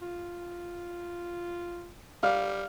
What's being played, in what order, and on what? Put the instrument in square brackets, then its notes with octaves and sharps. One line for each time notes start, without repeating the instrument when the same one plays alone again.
[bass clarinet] F4
[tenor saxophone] G3 [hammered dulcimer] F5